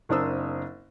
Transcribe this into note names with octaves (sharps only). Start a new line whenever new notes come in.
F#1 C4 D4 A#4 D#6 E6